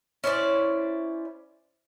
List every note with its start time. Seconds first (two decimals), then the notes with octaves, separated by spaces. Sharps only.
0.24 C#4 E4 C5 D5